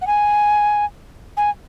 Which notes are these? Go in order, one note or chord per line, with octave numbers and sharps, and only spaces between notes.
F#5
G#5
G#5